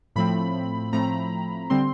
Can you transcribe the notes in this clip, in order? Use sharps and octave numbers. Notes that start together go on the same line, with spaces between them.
A2 F3 A3 C4 B5
A2 F3 A3 C4 A#5
D3 G3 C4 C6